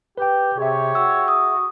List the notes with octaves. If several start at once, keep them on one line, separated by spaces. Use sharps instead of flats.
G4 B4 G5
C3 G4 G#4 C#5 E5
F#4 E6
D#6